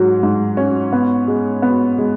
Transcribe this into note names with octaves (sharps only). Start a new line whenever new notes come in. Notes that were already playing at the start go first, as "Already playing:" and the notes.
Already playing: G#2 F#3
G#2
C#4
B3
G#3
B3
G#3